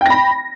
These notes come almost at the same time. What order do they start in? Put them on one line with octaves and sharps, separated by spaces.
G5 A#6 B5